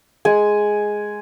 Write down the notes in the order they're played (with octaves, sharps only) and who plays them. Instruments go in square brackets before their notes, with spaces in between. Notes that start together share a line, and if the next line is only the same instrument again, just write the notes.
[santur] G#3 G#5